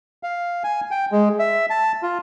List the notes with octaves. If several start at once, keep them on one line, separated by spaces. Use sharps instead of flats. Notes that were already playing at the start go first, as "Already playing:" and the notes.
F5
G#5
G5
G#3
E5
A5
F4